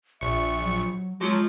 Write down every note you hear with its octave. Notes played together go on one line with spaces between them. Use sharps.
A#1 E5 C#6
F#3
F3 F#3 G#3